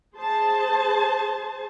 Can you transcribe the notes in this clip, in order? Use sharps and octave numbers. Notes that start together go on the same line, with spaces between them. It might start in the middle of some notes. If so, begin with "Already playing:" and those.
G#4 C5 A5